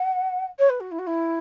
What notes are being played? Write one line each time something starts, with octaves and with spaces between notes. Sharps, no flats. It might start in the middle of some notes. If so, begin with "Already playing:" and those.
Already playing: F#5
C#5
B4
F#4
E4
F#4
E4